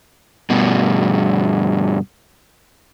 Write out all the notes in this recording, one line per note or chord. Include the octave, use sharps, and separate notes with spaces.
G2 B2